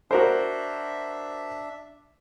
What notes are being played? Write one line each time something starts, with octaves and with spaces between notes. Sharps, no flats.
D4 F#4 A#4 C5 E5